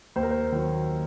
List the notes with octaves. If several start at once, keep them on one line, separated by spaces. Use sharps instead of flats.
D#2 C5
A#4
C5
D#3 F#3